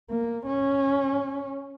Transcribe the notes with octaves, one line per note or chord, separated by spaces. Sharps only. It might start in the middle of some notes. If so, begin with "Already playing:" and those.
A#3
C#4